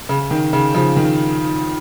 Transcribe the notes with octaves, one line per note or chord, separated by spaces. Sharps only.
C#3
D#3
C#3
C#3 F3
D#3